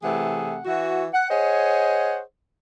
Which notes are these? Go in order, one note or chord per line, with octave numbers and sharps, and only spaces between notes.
C3 E3 A3 G#4 F#5
E3 F#4
F#5
G#4 C5 C#5 D#5 F#5